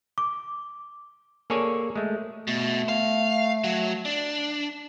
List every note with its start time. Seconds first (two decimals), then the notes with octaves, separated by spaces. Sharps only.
0.18 D6
1.50 A#3 G#4 A4 C#5 D5 G#5
1.96 G#3 A3
2.48 B2 A3
2.89 F5
3.64 F#3
4.05 D4